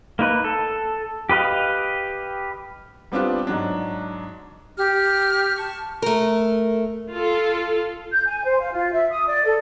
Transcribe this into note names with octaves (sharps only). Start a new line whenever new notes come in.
A#3 D#4 B4
A4
G4 B4 D#5 F5
G3 B3 C4 D4 F4 G4
G#2 F#3 D4
G4 F6
A5 C#6
A3 A#4
F4 A4
G6
G#5
C5
F5
F4
E5
D#6
D5
A4